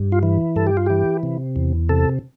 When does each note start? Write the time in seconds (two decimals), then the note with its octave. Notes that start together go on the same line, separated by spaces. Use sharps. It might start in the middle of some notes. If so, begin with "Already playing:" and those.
Already playing: G2
0.12 F4
0.23 E3
0.56 G2 A4
0.67 G4
0.77 F4
0.86 E3 G4
1.23 C3
1.56 E2
1.89 C3 A4